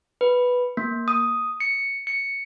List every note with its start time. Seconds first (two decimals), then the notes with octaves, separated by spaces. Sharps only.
0.21 B4
0.77 A#3
1.08 D#6
1.60 C#7
2.07 C#7